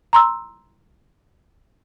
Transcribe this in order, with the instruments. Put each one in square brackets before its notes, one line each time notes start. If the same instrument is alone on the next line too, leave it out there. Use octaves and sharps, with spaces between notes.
[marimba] A#5 C6 E6